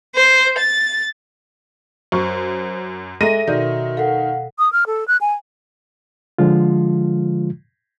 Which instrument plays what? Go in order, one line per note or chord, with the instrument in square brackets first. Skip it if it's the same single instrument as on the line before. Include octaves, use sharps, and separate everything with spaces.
[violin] C5
A6
[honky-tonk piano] F#2 [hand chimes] C5 [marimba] C#6
[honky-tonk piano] G#3 A#6 D#7 [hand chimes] G#4 E5 [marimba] A4 A#5
[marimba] B2 D5 G6 [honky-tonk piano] D#3 [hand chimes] F#4 A#4 E5
[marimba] A4 [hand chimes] F5 F#5
[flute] D#6
F6
A4
F#6
G#5
[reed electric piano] D3 F3 G#3 F4